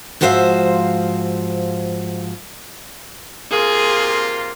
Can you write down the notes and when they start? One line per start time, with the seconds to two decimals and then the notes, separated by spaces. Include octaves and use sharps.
0.21 G#2 F3 F#4 C5 E5 F5
3.51 C3 A#3 F4 G#4